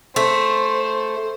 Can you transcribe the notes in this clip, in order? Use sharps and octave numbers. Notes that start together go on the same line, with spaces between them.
A3 C5